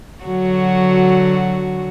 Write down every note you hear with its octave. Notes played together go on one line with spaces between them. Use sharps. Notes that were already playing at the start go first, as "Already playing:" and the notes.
D3 F#3 F#4